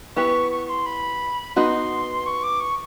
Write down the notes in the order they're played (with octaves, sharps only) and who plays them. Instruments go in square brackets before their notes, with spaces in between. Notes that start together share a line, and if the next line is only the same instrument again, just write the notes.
[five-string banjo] B3 E4 G4 B4 [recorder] C#6
[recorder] C#6
C6
B5
[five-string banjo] B3 D#4 F#4 [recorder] C6
[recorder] C#6
D6
C#6